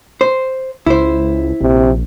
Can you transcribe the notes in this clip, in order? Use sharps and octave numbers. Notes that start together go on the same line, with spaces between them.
C5
C#2 E4 C5
A#1 C3